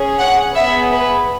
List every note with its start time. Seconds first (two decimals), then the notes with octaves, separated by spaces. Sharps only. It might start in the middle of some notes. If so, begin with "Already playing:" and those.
Already playing: C#4 G#4
0.19 F#5
0.55 B3 G#4 E5
0.92 B4